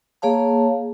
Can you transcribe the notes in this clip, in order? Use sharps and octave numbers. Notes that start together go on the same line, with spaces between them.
A#3 G#4 C#5 F5 A5